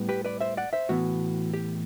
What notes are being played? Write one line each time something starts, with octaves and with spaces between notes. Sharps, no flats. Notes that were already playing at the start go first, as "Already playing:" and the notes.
Already playing: A2 G3 B3
G4 B4
B4 D5
C5 E5
D5 F#5
C5 E5
A2 E3 B3 F#4
G4